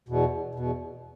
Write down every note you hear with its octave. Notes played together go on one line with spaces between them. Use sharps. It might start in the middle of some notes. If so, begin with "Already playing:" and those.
E2 B2
E2 B2